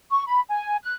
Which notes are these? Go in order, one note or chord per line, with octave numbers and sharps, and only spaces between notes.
C#6
B5
G#5
F#6